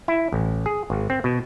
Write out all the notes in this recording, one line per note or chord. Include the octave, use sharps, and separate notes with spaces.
E4
A1
G#4
G#1
C4
B2